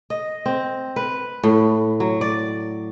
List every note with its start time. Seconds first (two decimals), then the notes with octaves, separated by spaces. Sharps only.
0.10 D#5
0.46 C4
0.96 B4
1.43 A2
2.00 F#3
2.21 D5